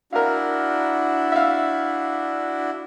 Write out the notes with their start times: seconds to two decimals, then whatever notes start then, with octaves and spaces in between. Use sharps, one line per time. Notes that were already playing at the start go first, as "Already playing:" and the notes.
0.13 D4 E4 F#4 A#4 F5
1.32 E5 F5